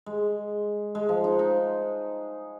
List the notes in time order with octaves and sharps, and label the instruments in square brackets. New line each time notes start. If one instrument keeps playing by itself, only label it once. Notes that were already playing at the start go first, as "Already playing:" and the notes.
[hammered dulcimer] G#3
G#3
F3
D#4
D#4